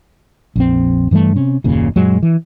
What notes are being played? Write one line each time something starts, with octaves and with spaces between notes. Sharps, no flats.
A#1 F2 C4
G2 E3 G3 A3
C3 C#4
F#1 D#2 A#2 C#3
F#2 A#2 F#3 G#3
E3